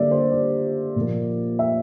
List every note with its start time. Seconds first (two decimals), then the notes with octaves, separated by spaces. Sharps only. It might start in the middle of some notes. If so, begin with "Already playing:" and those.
Already playing: D3 G3 A#3 D5 E5
0.11 C5
0.32 D5
0.96 A#2 F3 A#3
1.59 E5